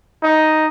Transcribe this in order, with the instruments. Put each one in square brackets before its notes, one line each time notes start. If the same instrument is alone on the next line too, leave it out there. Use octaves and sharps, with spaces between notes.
[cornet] D#4